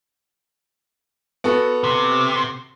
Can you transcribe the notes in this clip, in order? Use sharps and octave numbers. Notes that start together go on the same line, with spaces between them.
B3 F#4 A4
C3